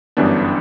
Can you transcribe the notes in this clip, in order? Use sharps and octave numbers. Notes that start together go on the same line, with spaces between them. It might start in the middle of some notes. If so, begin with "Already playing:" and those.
G1 F#2 E3 G3 B3 D4